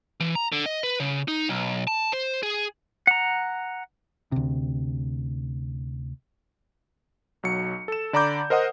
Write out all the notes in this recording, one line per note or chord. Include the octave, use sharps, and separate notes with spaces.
E3
A#5
D3
D#5
B4
C#3
D#4
B1
A5
C5
G#4
F#5 A#5
D2 C3
B1 F#3 C#7
A4 E7
D3 D5 A#5 B5 D6 G6
A#4 C5 D#5 F#5 D#6